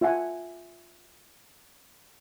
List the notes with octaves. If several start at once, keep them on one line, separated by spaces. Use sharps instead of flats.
F4 E5 F#5 G#5